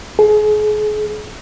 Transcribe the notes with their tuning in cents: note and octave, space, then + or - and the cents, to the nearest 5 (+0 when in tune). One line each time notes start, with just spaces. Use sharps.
G#4 +35